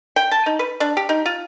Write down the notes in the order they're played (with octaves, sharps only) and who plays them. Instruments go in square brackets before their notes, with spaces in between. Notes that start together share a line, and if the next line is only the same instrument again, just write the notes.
[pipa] G5
A5
D#4
B4
D4
G4
D#4
F4